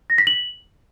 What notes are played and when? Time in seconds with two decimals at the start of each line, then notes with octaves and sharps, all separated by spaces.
0.10 A#6
0.18 B6
0.27 F#7